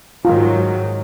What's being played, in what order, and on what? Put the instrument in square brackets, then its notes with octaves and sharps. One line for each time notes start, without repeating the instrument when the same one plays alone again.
[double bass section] G#2 D#3 F#3 [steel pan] F4